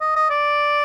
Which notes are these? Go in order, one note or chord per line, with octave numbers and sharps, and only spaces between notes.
D#5
D#5
D5